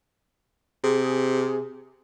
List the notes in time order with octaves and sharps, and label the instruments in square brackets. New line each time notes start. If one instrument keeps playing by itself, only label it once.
[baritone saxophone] C3 [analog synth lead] G#4